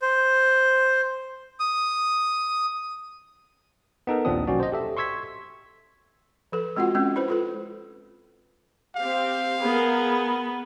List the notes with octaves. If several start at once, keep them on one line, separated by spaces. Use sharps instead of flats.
C5
D#6
B3 D#4 A4 A#4
A#1 D#2 F3 C4 D4 D#6
B1 F#3 C#4 F#4 D5
C5 D#5
G4 A4 E5
C6 C#6 E6 G#6 B6
F3 A4 B4
G#3 C4 F4 F#4 F#5
G#3 C4 C#4
E4 B4 C5
F4 A4 B4
C4 G4 F5
B3 G#4 A#4